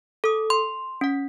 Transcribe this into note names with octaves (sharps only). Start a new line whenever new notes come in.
A4 D#6
C6
C#4 F#5